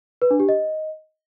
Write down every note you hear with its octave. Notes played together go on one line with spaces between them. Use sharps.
B4
D4
G4
D#5